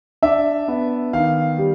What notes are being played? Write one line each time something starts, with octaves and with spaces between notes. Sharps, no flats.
D4 E5
B3
D#3 F5
G3